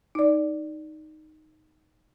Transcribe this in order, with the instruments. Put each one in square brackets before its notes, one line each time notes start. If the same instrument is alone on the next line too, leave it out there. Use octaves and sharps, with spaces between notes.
[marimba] D#4 D5